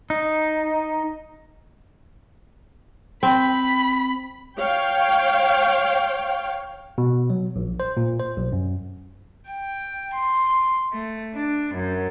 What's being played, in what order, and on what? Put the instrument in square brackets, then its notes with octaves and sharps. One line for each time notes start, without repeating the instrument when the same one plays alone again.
[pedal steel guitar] D#4
[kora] C4 [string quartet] B5
[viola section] C#5 F5 G5
[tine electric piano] B2
F#3
A#1
C5
A#2
C5
B1
F#2
[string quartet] G5
C6
A3
D4
F#2